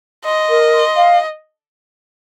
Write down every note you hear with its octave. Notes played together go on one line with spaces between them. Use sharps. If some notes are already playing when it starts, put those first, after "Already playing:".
D#5 C6
A#4
C6
F5